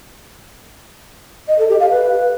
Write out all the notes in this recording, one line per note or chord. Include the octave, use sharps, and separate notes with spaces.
D#5
A4
G4
F5
B4